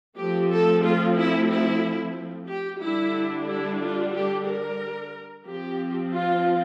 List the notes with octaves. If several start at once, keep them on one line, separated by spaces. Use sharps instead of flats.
F3 A3 C4 G4
A4
F4
E4
E4
G4
D3 G3 D4 E4
E4
F4
G4
A#4
F3 C4 G4
F4